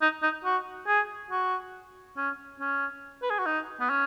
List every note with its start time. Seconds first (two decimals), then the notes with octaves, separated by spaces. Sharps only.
0.02 D#4
0.23 D#4
0.44 F#4
0.87 G#4
1.31 F#4
2.17 C#4
2.60 C#4
3.22 B4
3.30 G#4
3.39 F#4
3.46 D#4
3.80 B3
3.90 C#4